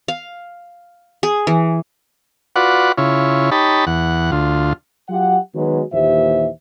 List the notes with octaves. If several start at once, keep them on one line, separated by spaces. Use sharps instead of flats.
F5
G#4
E3
F4 F#4 B4 D5 F#5
C#3 E4 F4 C#5
D#4 G4 C#5 A5 B5
E2 F#5
D2 F4
F#3 F4 G4 F#5
D#3 F#3 G#3 B3 F#4 B4
D#2 A#2 E3 G4 C5 E5